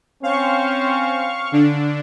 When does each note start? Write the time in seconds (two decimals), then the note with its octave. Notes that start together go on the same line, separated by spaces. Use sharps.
0.23 C4 C#4 C5 F5 C#6
1.52 D3 D4